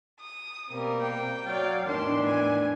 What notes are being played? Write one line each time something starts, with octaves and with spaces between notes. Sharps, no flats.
D#6
B2 G3 A#3 C4
G5
F#3 C#5 D5 F5
E2 A2 D#3 E3 D4 C6
G#5